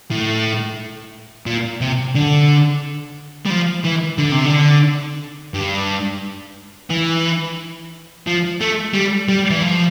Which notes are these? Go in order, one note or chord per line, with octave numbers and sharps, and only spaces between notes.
A2
A#2
C3
D3
G3
F3
E3
D3
C3
D3
G2
E3
F3
A3
G3
G3
E3
F3